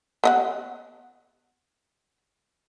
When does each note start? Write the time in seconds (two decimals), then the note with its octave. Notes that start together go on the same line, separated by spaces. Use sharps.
0.24 B3 D#5 F#5